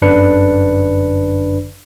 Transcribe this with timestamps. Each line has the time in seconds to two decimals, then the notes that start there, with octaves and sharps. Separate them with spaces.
0.02 G1 F#2 D3 D4 B4 C#7